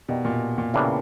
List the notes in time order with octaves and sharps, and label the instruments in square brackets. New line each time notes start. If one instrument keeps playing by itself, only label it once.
[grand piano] B2 [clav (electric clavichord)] G3 A#3 D#4 G4
[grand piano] A#2
A#2
[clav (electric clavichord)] A2 E3 G3 A#3 D4 [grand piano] C#3